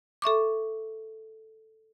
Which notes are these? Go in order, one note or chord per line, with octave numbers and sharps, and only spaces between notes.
A4 E5 C#6 D6